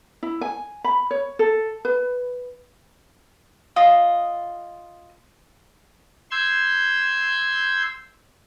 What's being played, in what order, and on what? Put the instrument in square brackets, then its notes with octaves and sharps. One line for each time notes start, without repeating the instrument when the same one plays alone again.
[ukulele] E4
G#5
B5
C#5
A4
B4
[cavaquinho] F4 D#5
[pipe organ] C6 E6 G6 G#6